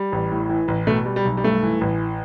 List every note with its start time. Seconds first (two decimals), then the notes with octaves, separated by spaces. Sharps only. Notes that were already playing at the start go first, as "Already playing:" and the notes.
Already playing: G3
0.12 A1
0.32 A2
0.49 E3
0.68 A1
0.87 B2 A3
1.06 G3
1.16 G3
1.25 B1
1.37 G3
1.43 G2 A3
1.63 E3
1.81 A1